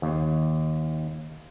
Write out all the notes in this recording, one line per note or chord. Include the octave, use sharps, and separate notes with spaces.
D#2